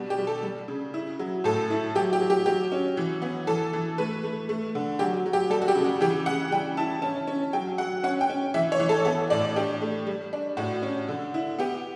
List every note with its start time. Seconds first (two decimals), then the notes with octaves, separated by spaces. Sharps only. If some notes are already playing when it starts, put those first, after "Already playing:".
Already playing: B2 G3 D4
0.10 G4
0.18 G3
0.27 A4
0.43 G3
0.68 C#3
0.94 E4
1.19 F#3
1.44 A2 A4
1.70 E4
1.95 F#3 G4
2.13 G4
2.21 F#3
2.30 G4
2.46 F#3 G4
2.72 C#4
2.97 E3
3.22 B3
3.47 E3 A4
3.73 E3
3.98 A3 B4
4.23 A3
4.49 A3
4.75 D3
4.99 F#3 G4
5.26 F#3
5.33 G4
5.50 G3 A4
5.62 F#4
5.68 G4
5.75 C#3
5.84 F#4
6.01 E3 G4
6.26 C#3 F#5
6.51 G3 G5
6.77 E4 A5
7.02 C#4 A5
7.27 C#4
7.53 F#3 G5
7.78 F#3 F#5
8.03 C#4 F#5
8.21 G5
8.30 C#4
8.54 E3 E5
8.72 C#5
8.80 E3
8.89 A4
9.05 B3 A4
9.30 A2 D5
9.56 D4 G4
9.82 A3
10.07 G3
10.33 D4
10.57 A2 F#4
10.82 C#4
11.09 D3
11.34 E4
11.59 B3 G4